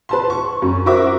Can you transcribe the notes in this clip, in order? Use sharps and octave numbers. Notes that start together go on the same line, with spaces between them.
B4 A5 C6
C#6
F#2
F#4 A#4 C5 E5 C#6 D6